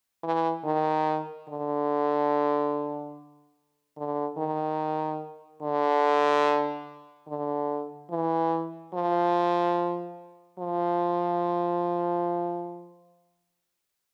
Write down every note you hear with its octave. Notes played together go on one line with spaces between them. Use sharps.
E3
D#3
D3
D3
D#3
D3
D3
E3
F3
F3